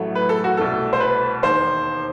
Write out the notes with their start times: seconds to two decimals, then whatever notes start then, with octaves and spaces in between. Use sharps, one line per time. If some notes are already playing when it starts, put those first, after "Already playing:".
Already playing: A1 A2 F#3 A3
0.15 B4
0.29 A4
0.44 F#4
0.57 C2 B2 A3 A4
0.93 C5
1.00 B4
1.43 E1 D#2 D#3 C5